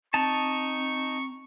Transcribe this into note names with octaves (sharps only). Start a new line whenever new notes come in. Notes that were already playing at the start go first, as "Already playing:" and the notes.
C4 D#4 A5 C#6